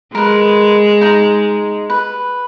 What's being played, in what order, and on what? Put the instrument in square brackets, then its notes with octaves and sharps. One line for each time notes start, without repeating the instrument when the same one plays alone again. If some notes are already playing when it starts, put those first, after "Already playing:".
[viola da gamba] G#3 [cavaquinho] A#4 B4
[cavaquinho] D#4 A#5
B4